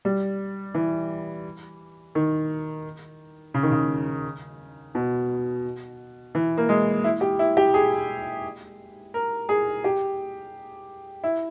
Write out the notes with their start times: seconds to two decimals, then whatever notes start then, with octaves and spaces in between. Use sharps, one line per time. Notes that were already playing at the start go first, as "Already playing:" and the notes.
0.05 G3
0.75 E3
2.15 D#3
3.54 C#3
3.63 D#3
3.71 C#3
4.95 B2
6.35 E3
6.58 A#3
6.69 G#3
7.04 E4
7.21 G4
7.39 E4
7.57 G4
7.74 G#4
9.14 A#4
9.49 G#4
9.84 G4
11.23 E4